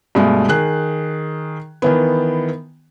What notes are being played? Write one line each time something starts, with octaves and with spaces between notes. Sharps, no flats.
G2 B2 G#3 A3
D#3 G#4 F#6
D#3 E3 B3